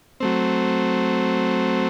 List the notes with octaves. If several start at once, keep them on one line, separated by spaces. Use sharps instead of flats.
F#3 A3 C4